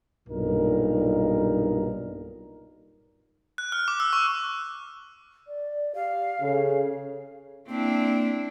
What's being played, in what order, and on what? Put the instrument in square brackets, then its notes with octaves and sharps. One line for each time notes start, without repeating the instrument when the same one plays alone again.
[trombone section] B1 G2 A#2 D#4 A#4
[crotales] F#6
F6
D6
E6
C#6
[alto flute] D5
[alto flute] G4 [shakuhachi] F5
[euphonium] C#3 [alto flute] A4
[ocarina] A#3 [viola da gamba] C4 D4 E4